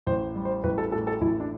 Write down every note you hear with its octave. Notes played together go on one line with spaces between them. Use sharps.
A1 C5
G3
C5
A1 B4
A4
A2 A4
A4
A1 E4
D4